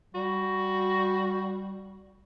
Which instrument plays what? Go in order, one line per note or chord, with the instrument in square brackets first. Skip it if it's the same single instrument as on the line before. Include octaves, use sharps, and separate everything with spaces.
[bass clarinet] G3 [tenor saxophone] F#4